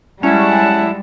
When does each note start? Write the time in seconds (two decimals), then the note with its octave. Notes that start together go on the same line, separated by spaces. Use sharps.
0.23 G3 G#3 C#4 E4 F#5 A5